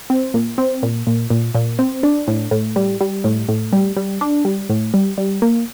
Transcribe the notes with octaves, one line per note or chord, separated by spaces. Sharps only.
C4
A#2
C4
A#2
A#2
A#2
A#2
C4
D4
A2
A2
G3
G3
A2
A2
G3
G3
D4
G3
A2
G3
G3
A#3